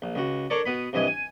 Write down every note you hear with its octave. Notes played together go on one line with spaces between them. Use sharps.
A#1
C#2 F#4
D4 A4 A#4 C#5 D5
B2 B3 B5
C2 G2 E3 D#5 G#5
G#5